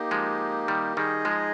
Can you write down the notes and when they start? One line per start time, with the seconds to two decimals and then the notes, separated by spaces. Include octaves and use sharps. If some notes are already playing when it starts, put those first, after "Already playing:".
Already playing: A#3 D#4 G4
0.11 F3 G#3
0.68 D#3 G3
0.97 D#3 G3 D#4 G#4 D#5
1.25 F3 G#3